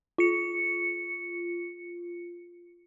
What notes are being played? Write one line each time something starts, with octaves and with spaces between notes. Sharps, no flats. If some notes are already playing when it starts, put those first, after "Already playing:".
F4 C#7